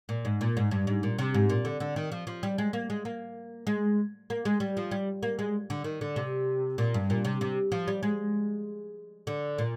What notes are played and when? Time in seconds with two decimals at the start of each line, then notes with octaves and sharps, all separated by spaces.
0.09 A#2
0.25 G#2
0.41 A#2
0.57 G#2
0.71 G2
0.87 G#2
1.03 A#2
1.18 C3
1.34 G#2
1.50 A#2
1.65 D3
1.80 D3
1.96 D#3
2.12 F3
2.27 F3
2.43 G3
2.58 G#3
2.73 A#3
2.90 G#3
3.05 A#3
3.67 G#3
4.30 A#3
4.45 G#3
4.60 G3
4.77 F3
4.91 G3
5.23 A#3
5.39 G#3
5.70 D3
5.84 D#3
6.01 D3
6.16 C3
6.78 A#2
6.94 G2
7.10 A#2
7.25 C3
7.41 C3
7.72 F3
7.87 G3
8.03 G#3
9.27 D3
9.58 A#2